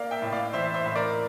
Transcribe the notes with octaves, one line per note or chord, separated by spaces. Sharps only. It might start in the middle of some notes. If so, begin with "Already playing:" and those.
Already playing: A#3 D5 F5
E5 G5
A2
D5 F5
E3 C5 E5
C5 E5
A2
A#4 D5